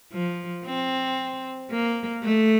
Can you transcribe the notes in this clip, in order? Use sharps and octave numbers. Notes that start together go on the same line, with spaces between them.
F3
C4
A#3
A3